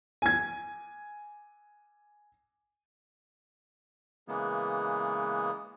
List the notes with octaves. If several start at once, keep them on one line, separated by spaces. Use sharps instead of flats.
G#5 G#6
C#3 E3 G#3 A#3 B3